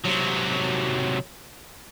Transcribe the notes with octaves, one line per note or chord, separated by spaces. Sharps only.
C3 F#3